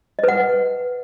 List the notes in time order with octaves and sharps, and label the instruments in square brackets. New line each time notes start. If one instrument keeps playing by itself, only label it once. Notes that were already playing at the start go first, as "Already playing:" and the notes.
[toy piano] D#5
B4
F#5